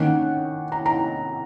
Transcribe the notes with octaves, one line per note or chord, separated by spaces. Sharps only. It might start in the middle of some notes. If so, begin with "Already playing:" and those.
Already playing: D#3 A#3 C#4 F#5
A#5
A#5